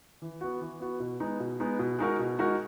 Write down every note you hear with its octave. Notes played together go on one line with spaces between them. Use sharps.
E3
B3 F#4
E3
B3 F#4
B2
G#3 B3 D#4
B2
G#3 B3 D#4
B2
G#3 D#4 F#4 A#4
B2
G#3 D#4 F#4 A#4